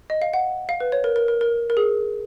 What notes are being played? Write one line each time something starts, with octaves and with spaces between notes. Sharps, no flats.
D#5
F5
F#5
F5
B4
C#5
A#4
A#4
A#4
A#4
A#4
G#4